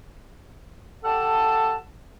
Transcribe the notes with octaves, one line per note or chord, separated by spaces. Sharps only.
G4 A4 F#5 A5